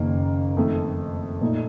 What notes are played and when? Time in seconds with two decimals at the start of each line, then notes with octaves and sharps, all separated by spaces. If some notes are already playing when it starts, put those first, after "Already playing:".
Already playing: F#1 F#2 D#3 A#3
0.57 F2 D#3 A3
1.41 A#2 A3 D#4